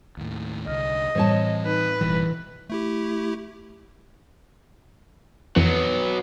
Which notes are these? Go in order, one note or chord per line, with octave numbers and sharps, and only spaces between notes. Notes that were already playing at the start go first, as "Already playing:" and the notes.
D#2 A2
C2 D3 D#5 F6
A2 E3 G3 C4 C5 C#5 A5
D#4 B4
F#1 B2 E3 G3
A3 E4 G4
F2 B2 E3 F#3